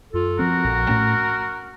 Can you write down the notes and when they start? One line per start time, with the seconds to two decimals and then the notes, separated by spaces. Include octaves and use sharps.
0.13 F#2 F4 A4
0.39 F3 C4 F#4 A#4
0.64 A#1
0.89 A2 A3 C#4